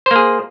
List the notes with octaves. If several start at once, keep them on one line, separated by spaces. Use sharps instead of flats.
A#3 G#4 C5